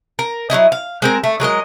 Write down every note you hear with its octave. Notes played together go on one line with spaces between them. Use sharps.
A#4
F#3 C#4 E4 D#5
F5
G#3 C4 A#4
A3
F#3 G#3 A#4 D#5